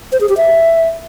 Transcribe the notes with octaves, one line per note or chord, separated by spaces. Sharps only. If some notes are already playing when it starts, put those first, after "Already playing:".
C5
G#4
G4
E5